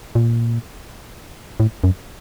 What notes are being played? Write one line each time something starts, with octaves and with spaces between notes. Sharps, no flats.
A#2
A2
F#2